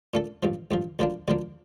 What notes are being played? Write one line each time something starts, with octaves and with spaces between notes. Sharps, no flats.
A#2 A3 D4 A4
A1 G2 F3
A1 G2 F3
D2 D3 F3 A#3 D4
D2 D3 F3 A#3 D4